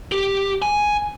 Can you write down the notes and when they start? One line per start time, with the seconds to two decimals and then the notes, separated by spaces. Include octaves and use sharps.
0.12 G4
0.62 G#5